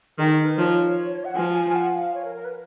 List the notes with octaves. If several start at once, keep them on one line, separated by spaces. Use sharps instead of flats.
D#3 G#4
A#4
B4
F3 C#5
F#5
F3 G#5
F#5
F5
C#5
A#4
A#4
B4